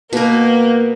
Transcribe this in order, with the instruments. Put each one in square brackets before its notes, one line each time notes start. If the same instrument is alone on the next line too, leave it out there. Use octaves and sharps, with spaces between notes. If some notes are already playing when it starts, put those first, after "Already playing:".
[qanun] B2 A#4 [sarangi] A#3